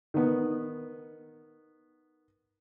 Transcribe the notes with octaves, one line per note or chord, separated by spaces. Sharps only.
D#3 B3